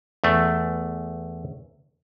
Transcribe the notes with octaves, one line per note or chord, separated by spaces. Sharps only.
E2 A3